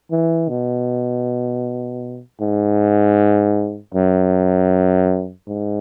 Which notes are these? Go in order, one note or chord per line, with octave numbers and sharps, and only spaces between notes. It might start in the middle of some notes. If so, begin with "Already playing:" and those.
E3
B2
G#2
F#2
G#2